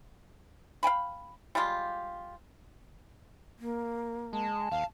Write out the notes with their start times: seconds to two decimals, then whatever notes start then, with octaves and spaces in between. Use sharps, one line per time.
0.83 F5 G5 G#5 B5
1.55 G3 G#3 F4 G4
3.59 A#3
4.33 G#3 A5
4.71 D#2 F5